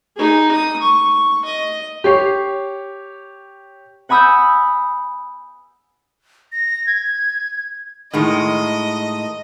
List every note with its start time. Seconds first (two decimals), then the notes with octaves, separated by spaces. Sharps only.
0.16 D#4 G#4
0.52 D#6
0.81 C#6
1.45 D#5
2.04 G4 C#5 C7
4.09 F#5 G#5 B5 D#6 E6 G6
6.52 A#6
6.87 G#6
8.13 A2 D#3 G#3 D#5